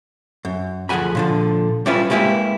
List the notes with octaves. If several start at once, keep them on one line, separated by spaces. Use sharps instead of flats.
F#2
D2 F3 G#4 F#5 G#5 B5
A#2 D3 F3
G3 C#4 E4 F4 B4
G3 G#3 A#3 E4 G4 B4